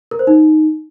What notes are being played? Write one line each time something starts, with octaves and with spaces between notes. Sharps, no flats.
A#4
C5
D#4